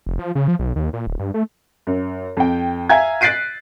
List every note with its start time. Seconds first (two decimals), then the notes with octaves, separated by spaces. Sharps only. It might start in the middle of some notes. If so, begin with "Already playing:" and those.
0.06 F1
0.19 F3
0.35 C#3
0.48 F3
0.59 B1
0.76 D#2
0.93 A#2
1.07 D1
1.19 G2
1.34 A3
1.87 F#2
2.37 F2 G5
2.89 E5 F5 G#5 A#5 G#6
3.21 F#6 A6 B6 C7 D7 D#7